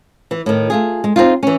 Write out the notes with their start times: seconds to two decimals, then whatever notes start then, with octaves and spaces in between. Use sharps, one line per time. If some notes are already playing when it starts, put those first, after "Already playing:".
0.31 E3
0.46 A2 D#3
0.70 A3 F4 G#4
1.04 G#3
1.16 C4 D#4 F4
1.43 E3 C#4